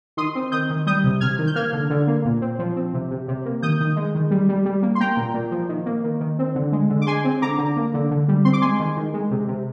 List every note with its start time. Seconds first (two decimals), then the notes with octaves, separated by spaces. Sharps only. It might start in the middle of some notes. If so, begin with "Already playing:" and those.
0.17 D#3 C6 D#6
0.35 C4
0.52 D#3 D#6 G6
0.70 D#3
0.86 G3 D#6 G6
1.04 C3
1.21 C3 F6 G#6
1.38 D#3
1.47 G6
1.56 A#3 F6 G#6
1.73 D3
1.90 D3
2.07 A#3
2.25 A#2
2.41 C4
2.59 F3
2.76 C4
2.94 C3
3.11 C3
3.28 C3
3.45 A#3
3.62 D#3 D#6 G6
3.80 D#3
3.96 G#3
4.15 D#3
4.31 G3
4.49 G3
4.65 G3
4.82 A#3
4.95 C6
5.00 A#3 G5 A#5
5.17 A#2
5.34 A#2
5.51 F3
5.69 D#3
5.86 A#3
6.04 D#3
6.20 D#3
6.39 C4
6.55 D3
6.72 G#3
6.90 D3
7.02 D6
7.07 G#3 G#5 C6
7.25 C4
7.42 D3 A#5 D6
7.58 D3
7.76 A#3
7.94 D3
8.11 D3
8.28 G3
8.45 C4 C6
8.53 D6
8.62 G#3 G#5 C6
8.80 D#3
8.97 D#3
9.14 G#3
9.31 C3
9.48 C3